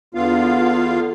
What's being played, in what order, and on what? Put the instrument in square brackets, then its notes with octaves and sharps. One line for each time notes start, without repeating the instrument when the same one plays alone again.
[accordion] E2 D3 B3 F4 F5